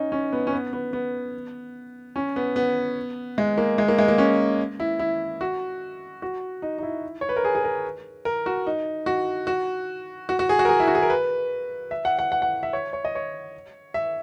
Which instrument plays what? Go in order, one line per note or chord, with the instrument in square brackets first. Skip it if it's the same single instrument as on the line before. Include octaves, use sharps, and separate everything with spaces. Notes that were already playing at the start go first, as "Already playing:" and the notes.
Already playing: [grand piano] C#4 D#4
C#4
B3
C#4
B3
B3
B3
C#4
B3
B3
G#3
A#3
G#3
A#3
G#3
A#3
C#4
E4
E4
F#4
F#4
D#4
D#4
E4
C#5
B4
A#4
G#4
G#4
A#4
A#4
F#4
D#4
F#4
F#4
F#4
F#4
G#4
F#4
A#4
G#4
E4
F#4
G#4
A#4
B4
E5
F#5
F#5
F#5
F#5
E5
C#5
C#5
D#5
C#5
E5